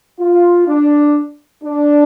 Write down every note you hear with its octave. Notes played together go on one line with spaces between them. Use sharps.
F4
D4
D4